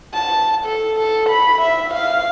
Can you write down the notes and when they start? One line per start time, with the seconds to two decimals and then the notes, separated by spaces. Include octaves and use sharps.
0.14 A5
0.65 A4
1.00 A4
1.29 B5
1.61 E5
1.94 F5